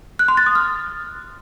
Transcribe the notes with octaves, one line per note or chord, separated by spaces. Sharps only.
F#6
C6
A6
D#6
F6